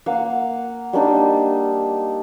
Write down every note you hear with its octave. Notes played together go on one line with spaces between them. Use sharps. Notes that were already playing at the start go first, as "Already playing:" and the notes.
A#3 F5 F#5
G3 A#3 D4 D#4